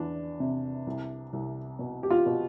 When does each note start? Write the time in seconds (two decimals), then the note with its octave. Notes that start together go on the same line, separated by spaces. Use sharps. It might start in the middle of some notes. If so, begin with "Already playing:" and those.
Already playing: E2 D4
0.40 C3
0.87 C2
1.33 C2
1.79 B2
2.03 G4
2.10 F4
2.26 B2